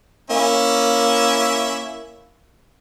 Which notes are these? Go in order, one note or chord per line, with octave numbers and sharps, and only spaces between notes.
A#3 C#4 E4 E5